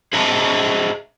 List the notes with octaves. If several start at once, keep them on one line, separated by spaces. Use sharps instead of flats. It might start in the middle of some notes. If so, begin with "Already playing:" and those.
G#4 C5 D#5 E5 A5 A#5